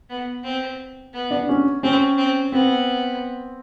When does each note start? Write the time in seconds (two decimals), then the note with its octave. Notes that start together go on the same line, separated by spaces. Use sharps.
0.09 B3
0.44 C4
1.13 B3
1.31 D4
1.49 C#4
1.83 C4 C#4
2.18 C4
2.52 B3 C4